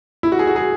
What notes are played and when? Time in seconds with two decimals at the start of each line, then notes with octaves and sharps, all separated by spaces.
0.23 E4
0.32 F#4
0.39 G#4
0.47 F#4
0.56 G#4